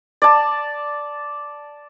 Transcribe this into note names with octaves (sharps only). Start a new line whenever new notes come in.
D5 A5